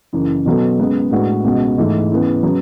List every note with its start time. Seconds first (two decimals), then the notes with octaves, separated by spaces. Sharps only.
0.13 F#1 F#2 C#3 E3
0.46 B2 F#3 B3 F#4 A4
0.78 F#2 C#3 G#3 B3
1.11 A2 G#3 D4 F#4 B4
1.44 C#2 B2 G#3 B3 F#4
1.77 G#2 E3 A3 E4 A4
2.11 C#3 E3 B3
2.43 C#3 F#3 B3